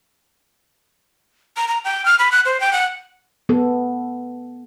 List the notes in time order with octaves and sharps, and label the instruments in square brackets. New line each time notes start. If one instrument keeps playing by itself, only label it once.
[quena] A#5
A#5
G5
F6
B5
F#6
C5
G5
F#5
[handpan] B3 A4